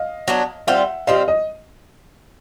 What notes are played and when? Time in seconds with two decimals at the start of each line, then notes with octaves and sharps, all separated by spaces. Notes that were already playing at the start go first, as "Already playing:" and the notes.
Already playing: D#5 F5
0.28 F#3 B3 D4
0.67 G3 C4 F4 E5 F#5
1.07 G3 C4 F4 D#5 F5
1.28 D#5